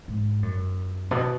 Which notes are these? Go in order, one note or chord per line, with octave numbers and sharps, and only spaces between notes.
G#2
F#2
B2